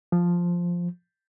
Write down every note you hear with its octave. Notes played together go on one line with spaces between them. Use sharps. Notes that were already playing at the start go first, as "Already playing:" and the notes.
F3